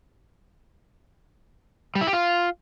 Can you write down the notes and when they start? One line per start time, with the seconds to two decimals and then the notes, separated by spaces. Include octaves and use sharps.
1.95 G3
2.01 E4
2.07 G4
2.13 F4